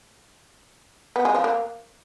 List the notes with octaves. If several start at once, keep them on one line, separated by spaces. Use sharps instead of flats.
B3
G#3
F3
A#3